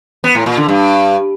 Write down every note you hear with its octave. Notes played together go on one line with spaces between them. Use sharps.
B3
A2
A#2
D3
G2